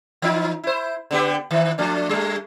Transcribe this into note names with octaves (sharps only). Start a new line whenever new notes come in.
E3 D#4
E4 C5
D3 B3 G4
D#3
F3 A3 D4
G3 A3